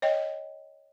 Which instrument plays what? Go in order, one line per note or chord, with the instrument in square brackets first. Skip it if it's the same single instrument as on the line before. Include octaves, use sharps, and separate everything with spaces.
[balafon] C#5 D#5 G5